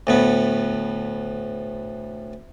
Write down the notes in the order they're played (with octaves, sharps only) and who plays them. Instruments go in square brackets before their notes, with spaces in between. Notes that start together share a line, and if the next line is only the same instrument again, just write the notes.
[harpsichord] D2 A2 B3